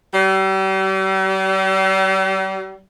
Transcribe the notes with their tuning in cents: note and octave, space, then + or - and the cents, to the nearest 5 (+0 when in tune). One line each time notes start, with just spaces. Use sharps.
G3 -40